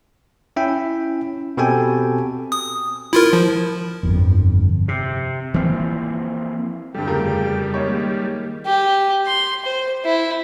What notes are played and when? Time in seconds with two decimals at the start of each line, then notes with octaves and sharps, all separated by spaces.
0.56 C#4 E4 E5 G5
1.57 B2 C4 G4 A4 G5 G#5
2.52 D#6
3.13 E4 F4 A#4
3.33 F3
4.03 G1 F2
4.88 C3
5.54 E3 F3 A#3 C4
6.94 E2 G2 D3 G3 A4 G5
7.07 F2 C#3 A3 A#4
7.74 D#3 G#3 A#3 D#4 C#5
8.66 G4
9.27 C6
9.65 C5
10.05 E4